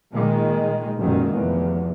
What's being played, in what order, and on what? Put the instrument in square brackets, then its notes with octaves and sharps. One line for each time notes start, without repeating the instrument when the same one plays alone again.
[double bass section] A#2 D#3 G#3
A1 F#2 A#2 D#3 G#3
F1 E2